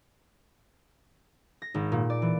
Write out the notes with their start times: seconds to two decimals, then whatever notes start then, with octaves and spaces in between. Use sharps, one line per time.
1.62 A#6
1.74 G#1
1.92 A#2
2.10 D5
2.22 E3